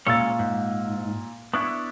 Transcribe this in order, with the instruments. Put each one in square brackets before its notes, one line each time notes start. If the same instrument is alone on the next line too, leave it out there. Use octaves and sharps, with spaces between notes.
[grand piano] A#2 E6 A6 [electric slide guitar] G#3 C#4 C#5
[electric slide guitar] G#2
[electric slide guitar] B3 D4 E4 [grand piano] C#6